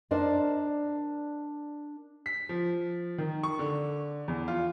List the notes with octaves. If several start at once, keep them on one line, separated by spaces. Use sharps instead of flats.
D4 A#4 C5 D5 D#5
B6
F3
D#3
C#6
D3
E2
F4